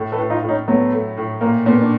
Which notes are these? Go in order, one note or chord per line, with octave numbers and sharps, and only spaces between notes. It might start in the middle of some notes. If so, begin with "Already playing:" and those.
Already playing: A2
A4 B4
A2
D#4 F4
A2
C#4 D#4
F#3 A3 B3
A3
A2
A#2 A#3
A#2 A3 B3
D4